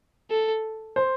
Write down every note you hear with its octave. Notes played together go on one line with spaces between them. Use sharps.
A4
C5